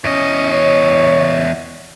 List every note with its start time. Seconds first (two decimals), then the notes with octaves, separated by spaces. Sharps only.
0.04 E2 C#4 D#5
0.52 C#5